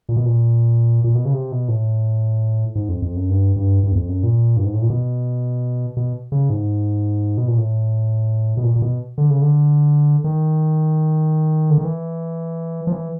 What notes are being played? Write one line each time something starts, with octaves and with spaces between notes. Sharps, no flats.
A#2
B2
A#2
A#2
B2
C#3
C3
B2
A2
G#2
F2
F2
F#2
G2
G2
G2
E2
F2
F#2
A#2
G2
G#2
A2
A#2
B2
B2
C#3
G#2
B2
A#2
A2
B2
A#2
A#2
B2
D3
C#3
D3
D#3
D3
D#3
E3
F3
E3